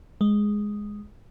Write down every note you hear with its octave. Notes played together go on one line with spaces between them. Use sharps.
G#3